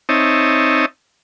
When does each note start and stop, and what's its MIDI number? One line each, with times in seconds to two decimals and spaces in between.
0.09 0.86 60
0.09 0.86 63
0.09 0.86 73
0.09 0.86 75
0.09 0.86 76
0.09 0.86 81